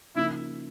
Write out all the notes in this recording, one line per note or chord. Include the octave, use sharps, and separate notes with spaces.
C#3 F3 A#3 D#4 E4